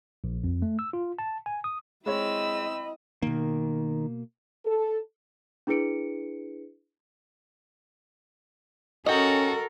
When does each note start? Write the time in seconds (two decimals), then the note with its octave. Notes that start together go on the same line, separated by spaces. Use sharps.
0.24 A#1
0.44 F2
0.62 A3
0.79 E6
0.93 F4
1.19 A5
1.46 G#5
1.64 D#6
2.06 G#3 C4 E4 C#5 D#5 B5 E6
3.22 B2 D#3 A#3
4.65 A4
5.67 D4 E4 G#4 B4 C#7 D7
9.06 C#4 F#4 A4 A#4 D#5 G5